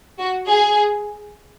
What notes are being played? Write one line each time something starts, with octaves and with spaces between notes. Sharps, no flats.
F#4
G#4